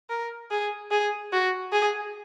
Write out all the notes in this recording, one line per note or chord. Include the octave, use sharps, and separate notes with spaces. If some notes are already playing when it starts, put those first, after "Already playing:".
A#4
G#4
G#4
F#4
G#4